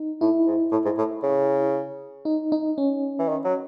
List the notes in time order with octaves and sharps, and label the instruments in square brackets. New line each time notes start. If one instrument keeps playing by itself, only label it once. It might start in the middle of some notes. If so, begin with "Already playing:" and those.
Already playing: [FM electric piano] D#4
[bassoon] A2 [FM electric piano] E4
[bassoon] G#2
A2
G#2
A2
C#3
[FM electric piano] D#4
D#4
C#4
[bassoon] E3
D#3
F#3